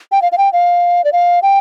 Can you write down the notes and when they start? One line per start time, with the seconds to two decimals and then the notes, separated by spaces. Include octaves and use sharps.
0.12 G5
0.22 F5
0.32 F5
0.38 G5
0.53 F5
1.04 D5
1.13 F5
1.42 G5